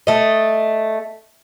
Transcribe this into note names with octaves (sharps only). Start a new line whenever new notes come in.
A3 D#5